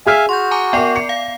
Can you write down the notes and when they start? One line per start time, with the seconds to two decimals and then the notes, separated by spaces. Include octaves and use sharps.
0.06 G#4 E5 F5 G#5 F6 B6
0.29 F#4 C6 G6
0.51 G#5 A#5 D6
0.73 B3 A#4 D5 G5 C7
0.95 C7 C#7
1.09 F5